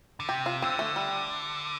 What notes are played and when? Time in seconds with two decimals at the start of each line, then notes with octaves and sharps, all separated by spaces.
0.20 D3
0.29 C3 G4
0.46 F4
0.62 D3 C4
0.79 A3
0.96 G3